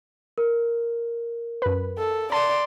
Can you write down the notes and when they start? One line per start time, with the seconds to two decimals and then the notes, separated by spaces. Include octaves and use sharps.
0.38 A#4
1.62 F#2 B4
1.98 A4
2.32 D5 A5 C6